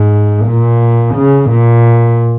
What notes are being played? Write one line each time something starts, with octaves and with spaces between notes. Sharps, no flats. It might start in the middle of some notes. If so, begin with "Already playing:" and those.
Already playing: G#2
A#2
C#3
A#2